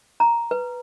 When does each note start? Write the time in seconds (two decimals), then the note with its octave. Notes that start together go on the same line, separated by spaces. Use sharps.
0.20 A#5
0.51 B4